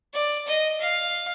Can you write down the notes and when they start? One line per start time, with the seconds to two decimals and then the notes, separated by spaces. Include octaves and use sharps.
0.14 D5
0.47 D#5
0.81 F5